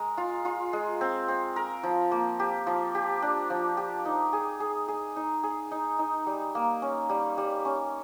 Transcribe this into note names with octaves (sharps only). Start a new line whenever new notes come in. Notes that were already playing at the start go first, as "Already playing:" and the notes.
Already playing: G#3 A#4
F4
F4
G#3
C4
C4
A#4
F3
A#3
G4
F3
G4
D4
F3
G4
D#4
G#4
G#4
G#4
D#4
G#4
D#4
D#4
G3
A#3
C#4
G3
G3
C#4